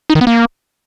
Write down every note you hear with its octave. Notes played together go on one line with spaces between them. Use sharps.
D#4
D#3
B3
A#3